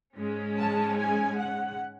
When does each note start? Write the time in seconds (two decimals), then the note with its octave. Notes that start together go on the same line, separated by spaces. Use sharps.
0.17 G#2 G#3 C#4
0.57 A5
0.97 G#5
1.38 F#5